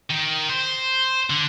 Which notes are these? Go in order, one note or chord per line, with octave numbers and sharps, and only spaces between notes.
D#3
C5
D3